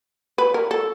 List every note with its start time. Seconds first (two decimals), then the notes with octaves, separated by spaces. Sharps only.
0.38 B4
0.54 A#4
0.71 A4